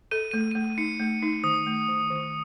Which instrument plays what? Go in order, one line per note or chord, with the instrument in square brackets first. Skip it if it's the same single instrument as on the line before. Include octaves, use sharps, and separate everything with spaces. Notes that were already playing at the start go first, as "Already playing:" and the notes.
[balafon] A4 [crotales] D#7
[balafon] A3 [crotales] D#7
[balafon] A3 [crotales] D#7
[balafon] D#4 [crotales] C#7
[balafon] A3
D#4
[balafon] D#3 [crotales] D#6
[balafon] A3
D#3
D#3